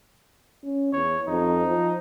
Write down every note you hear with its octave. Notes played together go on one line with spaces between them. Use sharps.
C#4
E2 C#5
F2 D#4
F3